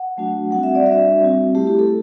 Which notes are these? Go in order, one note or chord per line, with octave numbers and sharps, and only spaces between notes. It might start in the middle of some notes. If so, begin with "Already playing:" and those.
Already playing: F#5
F#3 A3 D4 F#4
G3 C4 F#4 F#5
E5
D5
G3 D4 F#4 E5
G3 C4 F#4
A3 E4 G4
G4
A4